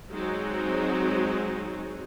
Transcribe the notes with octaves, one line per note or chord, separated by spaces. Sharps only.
F#3 G#3 C4 D#4 F#4